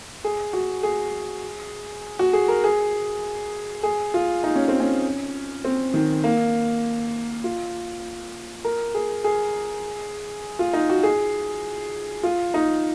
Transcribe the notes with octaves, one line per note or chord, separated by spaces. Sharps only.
G#4
F#4
G#4
F#4
G#4
A#4
G#4
G#4
F4
D#4
C#4
C4
C#4
C4
D#3
A#3
F4
A#4
G#4
G#4
F4
D#4
F#4
G#4
F4
D#4